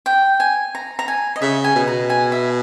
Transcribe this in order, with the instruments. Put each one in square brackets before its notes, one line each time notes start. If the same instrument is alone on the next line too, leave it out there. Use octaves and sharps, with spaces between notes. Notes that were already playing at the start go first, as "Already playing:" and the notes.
[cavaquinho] G5
G#5
A#5
A#5
G#5
D#5
[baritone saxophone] C#3 [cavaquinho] E5
[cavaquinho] G#5
[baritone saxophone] B2
[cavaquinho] A#5
G#5
E5